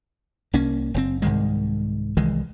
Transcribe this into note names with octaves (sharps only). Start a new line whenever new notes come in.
C2 A#3 C#4
F#1 A2 C4
C2 G#2 D#3 G#3
C2 D#3 E3 G#3